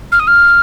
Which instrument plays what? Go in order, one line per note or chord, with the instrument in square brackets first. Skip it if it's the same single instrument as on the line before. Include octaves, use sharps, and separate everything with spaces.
[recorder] F6
D#6
F6